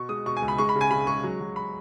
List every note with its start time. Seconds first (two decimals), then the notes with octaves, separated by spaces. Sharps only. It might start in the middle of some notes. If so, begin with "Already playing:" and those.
Already playing: B2 C#6
0.09 G#3 D#6
0.26 B2 C#6
0.37 G#5
0.42 C#2
0.48 B5
0.58 G#3 C#6
0.69 B5
0.75 C#3
0.81 G#5
0.91 C#3 B5
1.07 G#3 C#6
1.23 F#3
1.40 F#3
1.56 B5